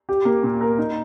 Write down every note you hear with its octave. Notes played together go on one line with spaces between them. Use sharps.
G4
A#3
A#2
A#4
D#4